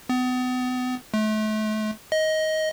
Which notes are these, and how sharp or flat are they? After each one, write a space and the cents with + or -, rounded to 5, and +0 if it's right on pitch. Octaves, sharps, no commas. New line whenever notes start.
B3 +35
A3 -35
D#5 +15